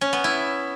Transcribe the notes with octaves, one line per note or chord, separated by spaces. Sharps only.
C#4
B3
E4